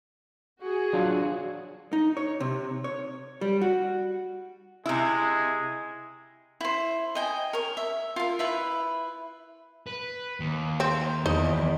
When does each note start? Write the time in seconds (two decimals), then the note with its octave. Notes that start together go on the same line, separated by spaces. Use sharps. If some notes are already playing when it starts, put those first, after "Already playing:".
0.59 F#4 G#4
0.93 F#3 D4 F4
1.93 D#4
2.17 C#5
2.40 C3
2.84 C#5
3.41 G3
3.61 F#4
4.86 C3 G#3 E4
6.61 E4 C5
7.15 D#5 G5 G#5
7.53 A#4 C#5
7.77 E5
8.16 F4 A#4
8.39 E4 B4 E5
9.87 B4
10.40 D#2
10.80 C4
11.26 E2 D#4 D#5